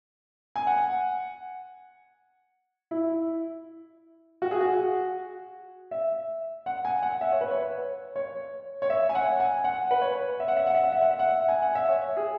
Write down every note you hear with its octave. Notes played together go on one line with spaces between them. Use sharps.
G#5
F#5
E4
F#4
G#4
F#4
E5
F#5
G#5
F#5
E5
C#5
B4
C#5
C#5
C#5
E5
G#5
F#5
G#5
F#5
B4
C#5
E5
F#5
E5
F#5
E5
F#5
E5
F#5
E5
F#5
E5
G#5
F#5
E5
C#5
G#4